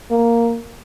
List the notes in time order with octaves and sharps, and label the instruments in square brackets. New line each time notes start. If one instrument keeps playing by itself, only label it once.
[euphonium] A#3